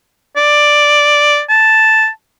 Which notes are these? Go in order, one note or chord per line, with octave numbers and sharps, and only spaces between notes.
D5
A5